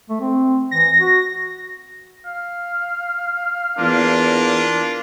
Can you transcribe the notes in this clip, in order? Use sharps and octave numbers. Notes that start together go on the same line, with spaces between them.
A3
C4
E3 A#6
F#4
F5
E2 A#3 D4 F4